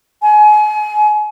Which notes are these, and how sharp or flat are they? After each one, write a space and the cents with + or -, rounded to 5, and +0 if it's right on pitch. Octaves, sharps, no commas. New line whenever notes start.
G#5 +30